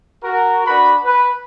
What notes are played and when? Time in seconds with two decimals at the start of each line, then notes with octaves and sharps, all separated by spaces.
0.24 F#4 A#4
0.67 D4 F#4 B4 B5
1.05 B4